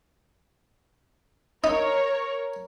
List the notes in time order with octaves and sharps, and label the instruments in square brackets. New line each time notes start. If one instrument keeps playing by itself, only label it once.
[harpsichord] D#4 [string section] A#4 C#5 A#5